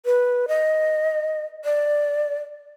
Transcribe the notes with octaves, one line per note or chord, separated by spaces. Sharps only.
B4
D#5
D5